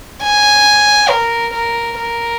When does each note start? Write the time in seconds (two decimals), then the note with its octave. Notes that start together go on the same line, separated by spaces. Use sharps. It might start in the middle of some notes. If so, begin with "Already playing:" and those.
0.22 G#5
1.10 A#4
1.54 A#4
1.98 A#4